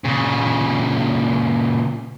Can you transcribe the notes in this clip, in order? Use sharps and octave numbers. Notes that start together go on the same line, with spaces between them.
A#2 C#3